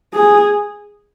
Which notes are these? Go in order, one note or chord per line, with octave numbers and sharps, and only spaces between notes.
G#4